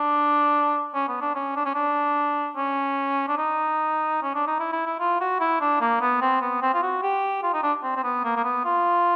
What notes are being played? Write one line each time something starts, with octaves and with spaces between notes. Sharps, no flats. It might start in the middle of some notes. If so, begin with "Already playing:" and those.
Already playing: D4
C#4
B3
D4
C#4
D4
C#4
D4
C#4
D4
D#4
C#4
D4
D#4
E4
E4
E4
F4
F#4
E4
D4
A#3
B3
C4
B3
C4
F4
F#4
G4
F4
D#4
D4
C4
C4
B3
A#3
A#3
B3
F4